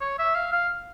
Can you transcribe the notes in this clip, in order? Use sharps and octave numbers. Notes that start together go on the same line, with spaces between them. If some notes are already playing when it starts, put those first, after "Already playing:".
C#5
E5
F5
F5